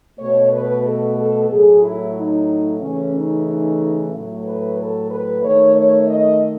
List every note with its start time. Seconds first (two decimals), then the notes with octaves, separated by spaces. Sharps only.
0.18 B2 A3 C#5
0.52 B4
0.84 A4
1.17 A4
1.49 A2 F#3 A3 G#4
1.81 E4
2.15 D#4
2.80 C#3 E3 A3 C#4
3.13 D#4
3.46 D#4
4.11 A2 F#3 A3
4.44 B4
4.76 A4
5.09 B4
5.41 D#3 A3 C#5
5.75 C#5
6.06 D#5